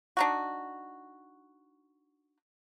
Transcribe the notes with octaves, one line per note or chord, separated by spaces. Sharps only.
D4 D#4 F#4